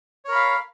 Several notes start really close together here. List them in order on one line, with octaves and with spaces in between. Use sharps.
C#5 A#4 B5 F5